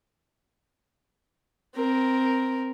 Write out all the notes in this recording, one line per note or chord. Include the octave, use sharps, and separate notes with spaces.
C4 A#4